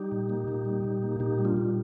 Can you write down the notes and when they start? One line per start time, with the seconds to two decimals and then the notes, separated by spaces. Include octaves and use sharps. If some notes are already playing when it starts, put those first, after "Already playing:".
Already playing: G3 D#4 G4
0.12 A#2
0.29 A#3
0.48 A#2
0.65 G3
0.84 A#2
1.03 A#3
1.20 A#2 D#4 G4
1.39 G3
1.45 D4 F4
1.57 A#2